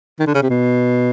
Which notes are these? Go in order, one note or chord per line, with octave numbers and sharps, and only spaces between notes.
D#3
D3
C#3
C3
B2